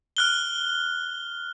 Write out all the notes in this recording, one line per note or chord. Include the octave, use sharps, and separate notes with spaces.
F6 F#6 G7